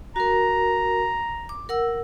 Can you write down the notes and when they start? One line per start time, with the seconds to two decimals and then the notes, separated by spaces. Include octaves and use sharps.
0.16 F#4 A#4 A#5
1.49 D6
1.69 A#4 F#5 E6